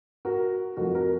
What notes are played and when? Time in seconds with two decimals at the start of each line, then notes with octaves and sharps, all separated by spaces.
0.25 F#4 A#4
0.77 F2 F3 F#4 A#4
0.95 F#4 A#4